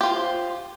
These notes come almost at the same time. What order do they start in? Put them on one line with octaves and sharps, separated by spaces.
G4 F4 C5